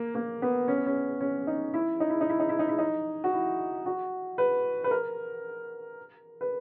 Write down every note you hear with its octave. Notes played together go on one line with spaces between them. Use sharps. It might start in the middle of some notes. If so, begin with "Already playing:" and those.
Already playing: A#3
A#3
B3
C#4
B3
C#4
C#4
D#4
E4
D#4
E4
D#4
E4
D#4
E4
D#4
E4
D#4
F#4
E4
F#4
B4
B4
A#4
B4